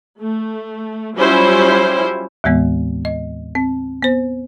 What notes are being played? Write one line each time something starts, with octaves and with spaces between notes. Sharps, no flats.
A3
F#3 G3 C#4 E4 F4 C5
D#2 A2 E3 G#3 B3
D#5
C4
B3 C5